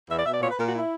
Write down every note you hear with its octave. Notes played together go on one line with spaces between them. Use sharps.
E2 E5
D5
B2 E5
D5
A#2 C#5
B4
A#2 A#4
F#4
E4